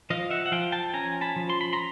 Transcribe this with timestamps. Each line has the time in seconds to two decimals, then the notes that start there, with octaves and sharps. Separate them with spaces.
0.10 F3 D#5 F5
0.31 E5 F#5
0.46 F#5
0.52 F3 F5 G5
0.72 G5 A5
0.94 C#4 G#5 A#5
1.21 A5 B5
1.36 F3
1.50 C6
1.61 B5
1.73 A#5 C6